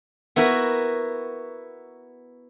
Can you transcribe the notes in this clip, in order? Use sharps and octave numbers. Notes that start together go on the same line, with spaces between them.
B3 E4 F#4 A#4 B4